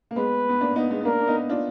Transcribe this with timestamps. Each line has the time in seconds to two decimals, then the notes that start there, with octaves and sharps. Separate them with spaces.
0.11 A#3
0.16 G#3 B3 B4
0.49 B3
0.61 A#3 D4
0.75 B3 D#4
0.90 G#3 B3
1.01 B3
1.05 A#3 D4 A#4
1.20 D4
1.27 B3 D#4
1.49 D4 F4